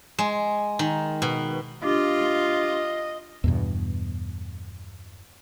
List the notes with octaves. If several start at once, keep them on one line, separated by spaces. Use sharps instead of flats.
G#3
D#3
B2
D4 F4 G4 D#5 D6
E2 G2 B2